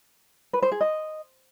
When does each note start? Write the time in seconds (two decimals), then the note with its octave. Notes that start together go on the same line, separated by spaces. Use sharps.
0.53 B4
0.63 C5
0.72 G#4
0.81 D#5